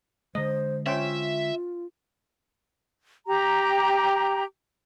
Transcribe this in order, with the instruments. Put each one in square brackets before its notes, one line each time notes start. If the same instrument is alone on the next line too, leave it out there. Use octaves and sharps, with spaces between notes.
[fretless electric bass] D3 G#3 [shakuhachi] C5 [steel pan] D#5
[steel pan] C#4 C5 G5 [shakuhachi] F4 [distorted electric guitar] E5
[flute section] G4 A#5